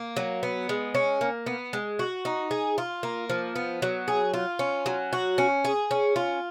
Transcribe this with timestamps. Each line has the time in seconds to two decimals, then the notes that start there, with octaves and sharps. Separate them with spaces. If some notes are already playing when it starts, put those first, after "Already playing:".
Already playing: A#3
0.16 F#3
0.43 B3
0.69 G#3
0.95 C#4
1.21 A#3
1.46 B3
1.73 G#3
1.99 F#4
2.25 D#4
2.51 G#4
2.78 F4
3.03 A#3
3.29 F3
3.56 B3
3.82 F#3
4.08 G#4
4.34 F4
4.59 C#4
4.86 F#3
5.13 F#4
5.38 C#4
5.65 G#4
5.91 C#4
6.16 F4